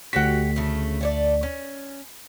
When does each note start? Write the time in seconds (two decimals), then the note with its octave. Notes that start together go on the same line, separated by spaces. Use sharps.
0.13 D2 F#4 G4 F#5 B6
0.56 C#3 A3
1.01 A3 C#5 D5
1.43 C#4